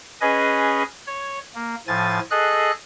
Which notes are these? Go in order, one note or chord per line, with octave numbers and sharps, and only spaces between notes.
C#4 G#4 B4 D#5 G#5
C#5
A#3
A2 F3 G#5 A6
G#4 A4 D#5 F#6